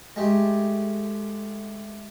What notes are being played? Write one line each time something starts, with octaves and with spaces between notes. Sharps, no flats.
G#3 A3 G4